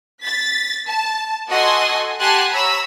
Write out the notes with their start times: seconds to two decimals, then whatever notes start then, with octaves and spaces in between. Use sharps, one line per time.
0.21 A6 B6
0.87 A5
1.49 F#4 A4 D#5 F#5 G#5 C6
2.19 G4 F#5 G#5 A5 C6 F#6
2.51 C#5 A#5 B5 E6